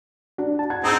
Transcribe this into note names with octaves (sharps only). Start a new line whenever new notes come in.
D4 F#4
A5
F#5 G#6
G#3 C4 D#4 A#5 E6